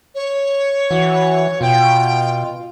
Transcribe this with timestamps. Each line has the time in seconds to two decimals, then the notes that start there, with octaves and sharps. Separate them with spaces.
0.14 C#5
0.91 E3 F#4
1.61 B2 F4 G5